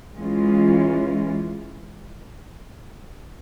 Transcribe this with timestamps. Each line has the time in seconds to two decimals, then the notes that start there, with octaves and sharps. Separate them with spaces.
0.17 E3 G#3 C#4 F4